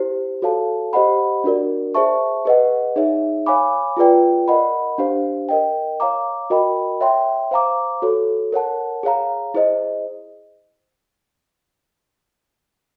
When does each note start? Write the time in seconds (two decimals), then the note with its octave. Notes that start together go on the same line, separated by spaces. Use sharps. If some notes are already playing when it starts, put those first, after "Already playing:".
Already playing: E4 G4 C5
0.42 F#4 A4 C#5 F5 A5
0.93 G4 C5 D#5 F#5 B5
1.44 D4 F#4 A#4 D5
1.95 G#4 C5 E5 A5 C#6
2.45 G#4 B4 D#5 F#5
2.96 D#4 G#4 C#5 E5
3.46 C#5 F5 G#5 B5 D6
3.97 F4 G#4 B4 D5 G5
4.48 A#4 D#5 F#5 B5
4.98 D4 G4 C5 F5
5.49 A#4 D#5 G5
6.00 C#5 F5 A#5 D6
6.50 F#4 A#4 D#5 G5 B5
7.01 C#5 E5 G5 C6
7.51 C5 F5 A#5 D6
8.02 F#4 A4 C#5
8.52 A#4 C#5 F#5 A5
9.03 G#4 C#5 F5 A#5
9.54 E4 G#4 C5 D#5